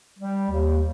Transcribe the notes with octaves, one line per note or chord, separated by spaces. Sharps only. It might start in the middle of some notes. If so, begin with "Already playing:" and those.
G3
D#2